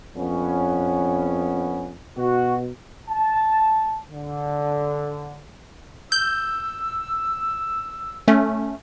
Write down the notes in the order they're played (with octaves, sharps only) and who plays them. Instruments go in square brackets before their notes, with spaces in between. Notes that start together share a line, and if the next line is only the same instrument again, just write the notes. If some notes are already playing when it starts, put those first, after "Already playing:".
[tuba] F2 [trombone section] B3 C#4
[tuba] B2 [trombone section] F#4
[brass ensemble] A5
D3
[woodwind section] E6 [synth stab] G6
[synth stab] A3 C#4